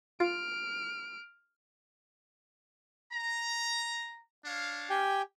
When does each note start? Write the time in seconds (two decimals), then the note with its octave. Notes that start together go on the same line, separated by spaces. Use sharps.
0.20 F4 F6 D7
3.12 A#5
4.45 D4 C#5 F5
4.90 G4 G5 G#5